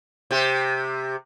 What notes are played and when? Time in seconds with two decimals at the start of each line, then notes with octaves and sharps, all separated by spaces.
0.31 C3 G4